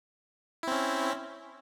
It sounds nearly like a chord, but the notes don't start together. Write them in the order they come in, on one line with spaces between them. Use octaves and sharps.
E4 C4 C#4